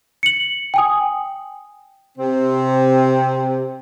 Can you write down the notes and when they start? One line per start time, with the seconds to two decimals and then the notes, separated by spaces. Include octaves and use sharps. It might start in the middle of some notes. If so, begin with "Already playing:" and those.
0.23 C#7 F#7
0.74 G5 G#5 D#6
2.18 C3 C4